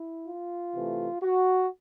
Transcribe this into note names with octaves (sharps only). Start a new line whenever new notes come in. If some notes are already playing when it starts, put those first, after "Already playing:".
Already playing: E4
F4
C3 E3 A3
F#4